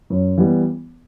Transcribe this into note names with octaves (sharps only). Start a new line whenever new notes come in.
F#2
E3 G3 B3